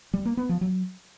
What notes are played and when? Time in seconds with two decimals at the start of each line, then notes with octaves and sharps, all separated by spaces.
0.14 G3
0.25 A#3
0.37 B3
0.49 F3
0.61 F#3